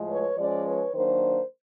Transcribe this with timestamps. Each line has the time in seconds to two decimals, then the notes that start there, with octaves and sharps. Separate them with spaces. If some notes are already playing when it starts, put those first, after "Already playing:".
Already playing: A2 F3 G#3
0.09 B4 C#5
0.37 F3 G#3 C#4 C5 D5
0.65 B4 C#5
0.94 D#3 F#3 A#3 D4 A#4 C5